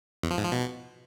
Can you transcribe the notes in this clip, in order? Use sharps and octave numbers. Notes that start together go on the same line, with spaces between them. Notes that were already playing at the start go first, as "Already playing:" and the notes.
E2
F3
G#2
F3
B2